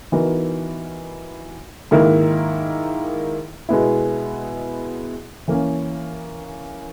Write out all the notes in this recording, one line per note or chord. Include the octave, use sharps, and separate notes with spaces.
E3 B3 D#4 F#4 A#4
G#2 D#3 A#3 E4 A#4
B2 G#3 B3 E4
E3 A#3 C#4